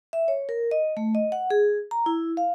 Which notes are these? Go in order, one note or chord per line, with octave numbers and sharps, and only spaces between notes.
E5
C#5
A#4
D#5
A3
D#5
F#5
G#4
A#5
E4
F5